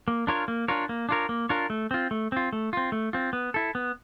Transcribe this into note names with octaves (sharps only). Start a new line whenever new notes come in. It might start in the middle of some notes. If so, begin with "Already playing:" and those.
A#3
D4 F4 A#4 C#5
A#3
D4 F4 A#4 C#5
A#3
D4 F4 A#4 C#5
A#3
D4 F4 A#4 C#5
A3
C4 F4
A3
C4 F4
A3
C4 F4
A3
C4 F4
B3
E4 A4
B3